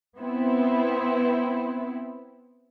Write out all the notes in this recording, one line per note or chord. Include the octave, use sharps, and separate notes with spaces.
B3 C4 E4